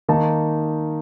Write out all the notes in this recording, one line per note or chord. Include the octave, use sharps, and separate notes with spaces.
D#3 A#3 D#4 A5